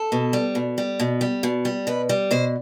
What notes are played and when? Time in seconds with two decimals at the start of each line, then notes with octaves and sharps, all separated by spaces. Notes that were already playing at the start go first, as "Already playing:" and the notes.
Already playing: A4
0.12 B2
0.33 G3
0.55 B2
0.78 G3
1.00 B2
1.21 G3
1.43 B2
1.65 G3
1.87 B2 B4
2.09 G3
2.31 B2 C5